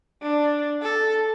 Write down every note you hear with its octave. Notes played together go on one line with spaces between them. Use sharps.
D4
A4